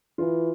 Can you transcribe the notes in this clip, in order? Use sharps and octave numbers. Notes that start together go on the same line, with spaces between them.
E3 F4